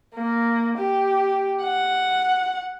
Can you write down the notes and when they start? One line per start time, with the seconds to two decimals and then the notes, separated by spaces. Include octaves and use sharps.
0.15 A#3
0.78 G4
1.62 F#5